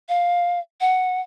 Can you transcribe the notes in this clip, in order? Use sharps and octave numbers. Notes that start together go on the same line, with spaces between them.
F5
F#5